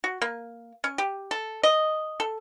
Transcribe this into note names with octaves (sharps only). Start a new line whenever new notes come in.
F#4
A#3
C#4
G4
A4
D#5
A4